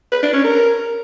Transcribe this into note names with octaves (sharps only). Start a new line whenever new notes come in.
B4
D4
C#4
A#4